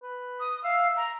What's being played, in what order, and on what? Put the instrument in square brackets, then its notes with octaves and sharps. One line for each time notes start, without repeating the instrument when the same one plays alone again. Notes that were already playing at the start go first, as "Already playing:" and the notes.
[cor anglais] B4
[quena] D#6
[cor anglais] E5 [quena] F5
[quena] A#5